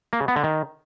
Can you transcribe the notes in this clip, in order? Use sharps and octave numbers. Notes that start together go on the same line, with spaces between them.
A#3
C#3
B3
D3
D#3